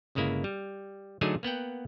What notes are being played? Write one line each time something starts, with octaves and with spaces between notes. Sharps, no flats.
G1 C#3 G#3 A#3 E4
G3
D3 F#3 A3 D#4 G#4 G#5
A#3 B3 F#5 G5